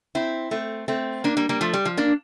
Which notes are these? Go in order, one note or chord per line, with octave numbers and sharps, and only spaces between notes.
C4 E4
A3 C4
A3 C4
A#3 D4
G3 A#3
G3 A#3
F3 A3
G3
F3
A#3 D4